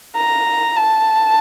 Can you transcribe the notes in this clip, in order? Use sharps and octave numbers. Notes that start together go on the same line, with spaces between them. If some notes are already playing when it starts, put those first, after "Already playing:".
A#5
A5